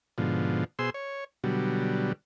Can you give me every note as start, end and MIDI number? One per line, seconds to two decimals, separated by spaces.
0.18 0.64 44
0.18 0.64 47
0.18 0.64 50
0.18 0.64 53
0.79 0.90 47
0.79 0.90 68
0.79 0.90 72
0.79 0.90 84
0.79 0.90 88
0.94 1.24 73
1.44 2.12 47
1.44 2.12 50
1.44 2.12 54
1.44 2.12 55